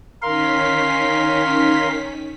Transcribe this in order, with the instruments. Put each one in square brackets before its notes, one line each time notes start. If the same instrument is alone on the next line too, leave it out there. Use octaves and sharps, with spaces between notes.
[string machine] D#3 C#4 B6 [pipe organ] A#4 F5 C6